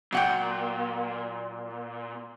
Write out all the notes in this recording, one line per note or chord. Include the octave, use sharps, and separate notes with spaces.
A#2 F#3 F#5 G5